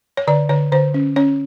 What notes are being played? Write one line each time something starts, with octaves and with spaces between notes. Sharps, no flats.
C#5
D3 D5
D3 C#5
D3 C5
C#4
C#4 C#5